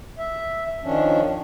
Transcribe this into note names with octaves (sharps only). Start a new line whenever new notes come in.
E5
D#3 F3 C#4 D4